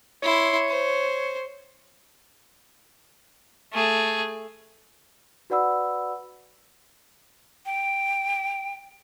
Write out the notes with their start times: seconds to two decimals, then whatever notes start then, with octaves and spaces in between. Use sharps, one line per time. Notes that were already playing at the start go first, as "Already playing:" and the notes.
0.23 E4 C#5 C6
0.68 C5
3.73 A3 G#4
5.50 F#4 B4 D5 F#5 B5 E6
7.66 G5